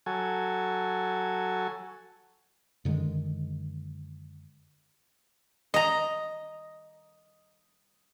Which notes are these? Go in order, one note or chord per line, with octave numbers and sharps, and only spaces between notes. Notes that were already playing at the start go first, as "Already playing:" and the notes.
F#3 A4 G#5
F#2 D3 D#3 G#3
D#5 A#5